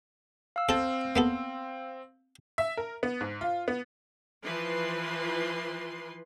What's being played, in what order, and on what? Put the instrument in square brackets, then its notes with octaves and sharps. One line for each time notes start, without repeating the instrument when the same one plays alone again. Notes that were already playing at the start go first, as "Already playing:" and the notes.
[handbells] F5 E6
[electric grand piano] C4 [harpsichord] A4 A5
[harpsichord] A#3 B3 A4
[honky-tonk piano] E5
A#4
B3
G#2
F4
B3
[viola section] E3 F3 B4 C6